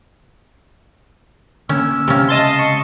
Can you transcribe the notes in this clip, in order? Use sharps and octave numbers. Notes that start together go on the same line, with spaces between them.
D3 A#3 C#4 E6
C#2 C3 C#4 F5
D#5 A5 C6
C#6